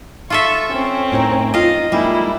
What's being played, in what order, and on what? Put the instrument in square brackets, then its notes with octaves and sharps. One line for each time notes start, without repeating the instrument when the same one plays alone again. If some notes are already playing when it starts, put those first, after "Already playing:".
[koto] F4 A4 E5 [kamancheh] C#6
[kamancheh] C4 C#4
[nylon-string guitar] A2 D#4 A#4
[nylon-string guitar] D#4 F4 [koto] D#5 F5
[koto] G3 [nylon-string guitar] G#3 A#3 D#4 [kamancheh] E4